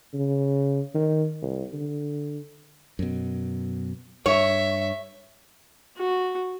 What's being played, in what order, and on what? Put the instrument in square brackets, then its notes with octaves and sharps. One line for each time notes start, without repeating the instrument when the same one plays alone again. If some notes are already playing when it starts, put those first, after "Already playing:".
[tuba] C#3
D#3
C2
D3
[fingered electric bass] F#2 B2
[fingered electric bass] G2 [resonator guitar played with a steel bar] C#5 [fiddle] E5
[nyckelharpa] F#4